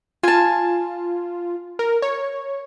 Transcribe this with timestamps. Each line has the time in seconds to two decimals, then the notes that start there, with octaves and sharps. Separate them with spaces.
0.23 F4 G#5 A5
1.79 A#4
2.02 C#5